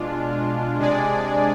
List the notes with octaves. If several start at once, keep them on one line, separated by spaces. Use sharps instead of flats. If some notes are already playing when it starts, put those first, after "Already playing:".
Already playing: B2 G#3 D4 F4
C3 G#3 D4 G#4 D5